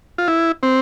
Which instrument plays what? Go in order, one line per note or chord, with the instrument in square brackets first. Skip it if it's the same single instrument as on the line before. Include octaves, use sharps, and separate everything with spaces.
[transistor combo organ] F4
E4
C4